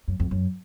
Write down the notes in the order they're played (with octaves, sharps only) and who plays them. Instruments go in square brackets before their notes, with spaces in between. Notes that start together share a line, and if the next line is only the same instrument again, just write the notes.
[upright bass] F#2
F2
F#2